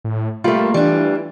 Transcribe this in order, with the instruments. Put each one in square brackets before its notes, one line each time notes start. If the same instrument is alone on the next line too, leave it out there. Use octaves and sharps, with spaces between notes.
[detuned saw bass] A2
[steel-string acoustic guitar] G3 A3 [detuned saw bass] A#3 [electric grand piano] F4
[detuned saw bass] E3 [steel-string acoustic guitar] G3 D4